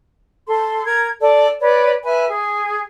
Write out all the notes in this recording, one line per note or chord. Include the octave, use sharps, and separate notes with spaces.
A4 C6
A#4 G#6
A4 D5
B4 C#5 D5
B4 E5 G#5
G#4